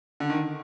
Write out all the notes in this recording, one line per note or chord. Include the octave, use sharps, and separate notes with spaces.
D3
D#3